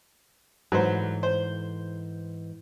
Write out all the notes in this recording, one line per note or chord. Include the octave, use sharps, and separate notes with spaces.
G#2 E3 F#3 A3 B4 C5
C5